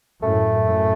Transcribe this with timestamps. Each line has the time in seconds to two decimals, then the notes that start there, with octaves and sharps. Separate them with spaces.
0.23 F#2 A2 A3
0.64 F#2 A2